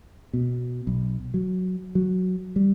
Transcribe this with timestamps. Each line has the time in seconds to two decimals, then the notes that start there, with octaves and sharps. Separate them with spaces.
0.33 B2
0.87 B1
1.34 F#3
1.95 F#3
2.56 G3